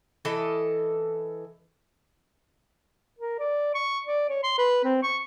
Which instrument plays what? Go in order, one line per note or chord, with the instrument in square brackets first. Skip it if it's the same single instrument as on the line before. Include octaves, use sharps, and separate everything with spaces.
[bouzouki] E3 A4 D#5
[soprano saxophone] A#4
D5
C#6
D5
C#5
C6
B4
C4
C#6